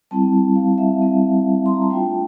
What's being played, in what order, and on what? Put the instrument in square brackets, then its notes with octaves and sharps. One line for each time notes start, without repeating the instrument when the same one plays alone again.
[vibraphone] G3 C4 E4 A5
A5
F5
E5
G3 C4 E4
C6
A#5
A5
A3 D4 F4 G5